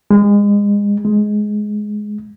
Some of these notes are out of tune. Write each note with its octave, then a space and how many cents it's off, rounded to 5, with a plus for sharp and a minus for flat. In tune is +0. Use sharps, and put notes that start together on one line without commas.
G#3 -30
G#3 +10